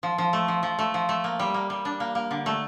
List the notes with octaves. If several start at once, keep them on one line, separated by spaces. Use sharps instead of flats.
F3
F3
A3
F3
F3
A3
F3
A3
A#3
G3
A#3
G3
D4
A#3
A#3
D3
A3